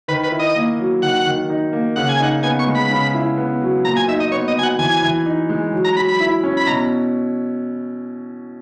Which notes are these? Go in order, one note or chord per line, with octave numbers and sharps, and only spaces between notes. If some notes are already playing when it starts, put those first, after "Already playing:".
D#3 B4
B4
E4
D#5
A#3
F#3
D#3 F#5
D#3
D#4
A#3
C#3 F#5
G#5
D#4 F#5
B3 G#5
C#6
G#3
B5
C#3
E4
B3
F#3
A#2 A#5
G#5
D#4 E5
D#5
B3 C#5
D#5
F#3 G#5
F#5
E3 G#5
E3
D#4
G#3
F#3
A#5
F#3 B5
B5
E4
C#4
B5
B2 A#5